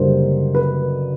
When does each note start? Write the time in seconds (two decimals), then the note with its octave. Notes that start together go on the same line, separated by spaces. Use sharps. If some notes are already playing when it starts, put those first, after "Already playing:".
Already playing: F#1 F#2 D3 G3 A#3 C5
0.54 B4